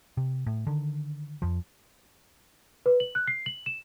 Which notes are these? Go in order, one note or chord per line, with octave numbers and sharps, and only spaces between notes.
C3
A2
D3 D#3
F2 F3
B4
F#7
F#6
C7
F#7
E7